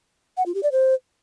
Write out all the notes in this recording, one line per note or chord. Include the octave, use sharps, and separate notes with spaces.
F#5
F4
G4
D5
C5